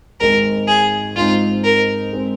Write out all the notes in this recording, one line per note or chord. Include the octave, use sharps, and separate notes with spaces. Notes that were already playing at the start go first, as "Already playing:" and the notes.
G#1 G#2 G#3 A#4
G#4
G#2 G#3 C4 D#4 F4
A#4
G#3 C4